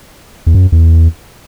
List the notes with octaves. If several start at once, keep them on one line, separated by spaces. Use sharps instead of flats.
E2
F#2
E2